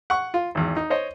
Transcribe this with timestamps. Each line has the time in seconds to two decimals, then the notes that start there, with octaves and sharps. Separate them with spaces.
0.10 F#5 C#6
0.34 F4
0.55 G#1 E2
0.76 D#4
0.90 C5 C#5 D#5